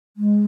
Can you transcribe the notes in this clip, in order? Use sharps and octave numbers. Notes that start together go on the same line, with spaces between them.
G#3